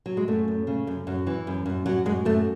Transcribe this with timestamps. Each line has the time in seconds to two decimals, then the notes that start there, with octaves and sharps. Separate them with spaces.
0.06 F#3
0.17 G#3
0.28 F#2 A3
0.48 F#2
0.67 C#3
0.87 F#2
1.07 F#2
1.27 E3
1.47 F#2
1.66 F#2
1.86 F#2 F#3
2.06 F#2 G#3
2.25 F#2 A3